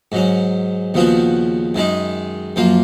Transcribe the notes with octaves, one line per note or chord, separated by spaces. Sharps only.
G#2 F#3 C#4
D#2 C#3 F3 B3 F#4
F#2 D#3 G#3 D#4
F#2 F3 A#3 F4